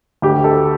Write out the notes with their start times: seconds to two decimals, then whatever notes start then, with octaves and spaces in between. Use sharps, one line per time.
0.22 D2 G4
0.44 A4